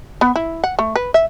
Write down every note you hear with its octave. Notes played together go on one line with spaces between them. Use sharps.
B3
E4
F#5
A3
B4
E5